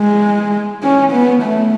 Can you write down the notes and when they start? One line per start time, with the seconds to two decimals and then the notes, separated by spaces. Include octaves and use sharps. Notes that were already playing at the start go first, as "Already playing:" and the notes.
Already playing: G#3
0.83 C#4
1.12 B3
1.42 A3